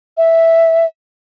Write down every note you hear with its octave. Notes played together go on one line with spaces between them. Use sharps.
E5